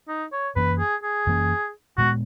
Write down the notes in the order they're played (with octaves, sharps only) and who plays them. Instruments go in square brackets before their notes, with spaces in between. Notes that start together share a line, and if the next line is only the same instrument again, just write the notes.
[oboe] D#4
C#5
[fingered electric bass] F#2 E3 A#3 C#4 [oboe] B4
[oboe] G#4
G#4
[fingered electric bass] F#2 E3 A#3 C#4
[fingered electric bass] A#2 G#3 B3 [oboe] F#4